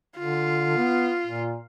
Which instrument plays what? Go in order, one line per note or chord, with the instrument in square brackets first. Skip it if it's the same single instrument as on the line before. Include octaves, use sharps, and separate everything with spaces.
[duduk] D3 [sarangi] F4
[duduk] B3
A#2